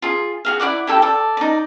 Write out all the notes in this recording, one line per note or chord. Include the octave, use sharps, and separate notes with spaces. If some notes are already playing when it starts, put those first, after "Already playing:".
F4 G#4
F#4 G#4 F5
E4 D5 F#5 D6
E4 G4 A4 G5
A4 D5
D#4 D5